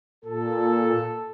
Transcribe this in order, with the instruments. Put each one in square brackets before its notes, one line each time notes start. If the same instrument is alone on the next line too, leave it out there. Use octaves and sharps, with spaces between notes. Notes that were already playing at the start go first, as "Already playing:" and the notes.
[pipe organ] A#2 [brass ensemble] A4